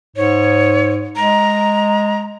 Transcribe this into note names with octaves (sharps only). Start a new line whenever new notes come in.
G#2 C#5
G#3 A#5